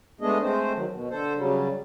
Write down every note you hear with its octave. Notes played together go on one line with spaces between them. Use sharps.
G#3 A3 B3 D4 G#4 D#5
G#3 A3 C4 C5
D#3 F#3
B2
D3 A4 C5
C#3 F#3 G3